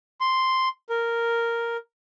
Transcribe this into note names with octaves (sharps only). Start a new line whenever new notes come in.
C6
A#4